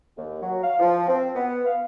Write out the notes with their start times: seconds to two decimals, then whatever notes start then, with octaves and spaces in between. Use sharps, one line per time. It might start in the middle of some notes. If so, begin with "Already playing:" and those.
0.17 D#2
0.41 F#3
0.62 F5
0.79 F3
1.08 C4
1.34 B3
1.66 F5